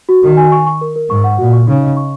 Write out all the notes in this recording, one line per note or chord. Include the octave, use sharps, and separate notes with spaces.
F#4
D#3 F#4
G#5
C#6
C#6
A#4
A#4
G#2 C#6
F#5
A#2 F#4
C#6
C#3 D#4
D#5
C#6